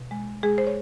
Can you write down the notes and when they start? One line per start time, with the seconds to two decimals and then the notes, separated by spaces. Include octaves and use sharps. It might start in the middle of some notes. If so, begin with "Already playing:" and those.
Already playing: B2
0.11 G#3
0.43 G#3 G#4
0.58 C5
0.67 C#5